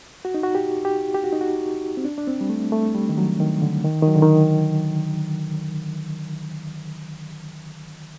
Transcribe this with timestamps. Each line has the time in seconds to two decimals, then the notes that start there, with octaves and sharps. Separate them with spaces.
0.25 F#4
0.34 D#4
0.43 F#4
0.55 G4
0.85 G4
1.15 G4
1.24 F#4
1.32 D#4
1.41 F#4
1.97 C4
2.04 D4
2.18 D4
2.27 C4
2.41 G3
2.49 A3
2.72 A3
2.95 G3
3.09 D#3
3.18 F#3
3.40 D#3
3.62 D3
3.85 D#3
4.02 D#3
4.07 F#3
4.15 D3
4.22 D#3